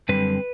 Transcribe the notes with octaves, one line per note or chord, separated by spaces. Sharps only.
F#2 D3 G3 C4 B4